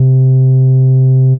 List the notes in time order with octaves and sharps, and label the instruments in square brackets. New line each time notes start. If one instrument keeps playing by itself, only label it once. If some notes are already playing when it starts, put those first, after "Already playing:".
Already playing: [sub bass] C3